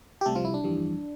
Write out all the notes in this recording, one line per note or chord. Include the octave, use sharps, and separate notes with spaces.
G4
C2 C3 G3 A3 A4
F3 F4
E4
D4
G1 F2 E3 G3